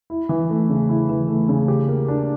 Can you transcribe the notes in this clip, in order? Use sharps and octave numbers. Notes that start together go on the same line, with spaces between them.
E4
E3
A3
C#3
E4
E3
A3
C#3
G4
A#3
D4